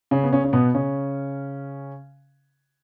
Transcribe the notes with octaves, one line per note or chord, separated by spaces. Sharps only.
C#3 C#4
B3
C#3 C#4
C#4
B2 B3
C#3 C#4